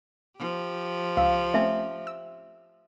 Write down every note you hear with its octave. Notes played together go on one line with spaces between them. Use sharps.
F3 G4
C#2 F5 E6
A3 C4 C#4 E5
E6